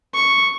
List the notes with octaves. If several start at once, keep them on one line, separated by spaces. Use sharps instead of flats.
C#6